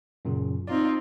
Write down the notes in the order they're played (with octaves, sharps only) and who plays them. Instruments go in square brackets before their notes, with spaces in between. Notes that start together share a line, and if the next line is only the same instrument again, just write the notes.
[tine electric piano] F#2 A#2 C#3
[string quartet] C4 D#4 F4 [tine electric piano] D5